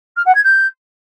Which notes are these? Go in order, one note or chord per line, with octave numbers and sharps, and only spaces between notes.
F6
F#5
G#6
G6